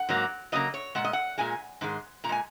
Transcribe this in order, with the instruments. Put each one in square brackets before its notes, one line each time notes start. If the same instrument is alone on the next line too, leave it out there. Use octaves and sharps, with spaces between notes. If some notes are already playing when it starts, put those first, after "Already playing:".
Already playing: [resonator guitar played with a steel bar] F#5
G#2 F#3 A#3
C#3 F#3 A#3 D#5
C#5
A#2 G#3 F#5
D#5
F#5
A#2 G#3 G#5
G#2 D#3 G#3
A#2 A#5
G#3 G#5